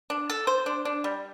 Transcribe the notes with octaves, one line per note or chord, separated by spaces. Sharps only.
D4
A4
C5
D4
D4
G3